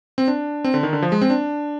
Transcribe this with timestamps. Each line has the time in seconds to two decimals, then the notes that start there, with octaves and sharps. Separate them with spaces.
0.18 C4
0.28 D4
0.64 C4
0.74 D3
0.83 D#3
0.93 D3
1.02 F3
1.12 G#3
1.21 C4
1.30 D4